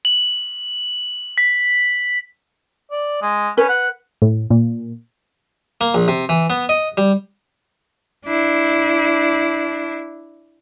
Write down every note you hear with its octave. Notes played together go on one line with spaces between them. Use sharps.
F#7
B6
D5
G#3
C#4 B4
F#5
A2
A#2
A#3
A#1
C3
E3
B3
D#5
G3
D4 E4